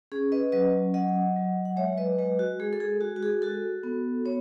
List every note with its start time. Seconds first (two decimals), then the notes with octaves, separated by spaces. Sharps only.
0.12 C#4 G#4
0.32 B4 D#5
0.52 F#3 B4 D#5
0.94 F#3 D#5 F#5
1.36 F#3
1.65 F#5
1.77 G#3 C#5 E5
1.97 B4 D#5
2.18 G#3 B4 D#5
2.39 F#4
2.60 G#3 G#4
2.73 A4
2.80 G#4
3.01 G#3 F#4
3.16 F#4
3.23 G#4
3.42 F#4 A4
3.83 B3
4.26 B3 C#5